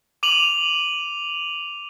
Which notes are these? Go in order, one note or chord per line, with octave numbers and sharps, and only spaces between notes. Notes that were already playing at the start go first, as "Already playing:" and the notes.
D6 D#7 F7 F#7